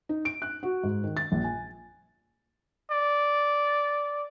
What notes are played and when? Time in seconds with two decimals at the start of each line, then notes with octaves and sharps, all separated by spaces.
0.09 D#4
0.25 D7
0.42 F#6
0.63 F#4
0.83 G#2
1.04 D#3
1.17 A6
1.32 A#1
1.44 G#5
2.91 D5